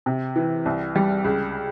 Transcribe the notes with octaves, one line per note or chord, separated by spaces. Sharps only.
C3
E3
C2
G3
C#2